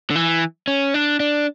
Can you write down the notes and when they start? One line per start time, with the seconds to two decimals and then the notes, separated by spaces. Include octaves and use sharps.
0.11 D3
0.16 E3
0.68 C#4
0.94 D4
1.20 D4